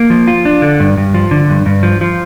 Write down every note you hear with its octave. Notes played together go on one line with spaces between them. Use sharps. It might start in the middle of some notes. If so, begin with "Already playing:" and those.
Already playing: A#3
F3
F4
D4
D3
G2
G2
F3
D3
G2
G2
F3
F3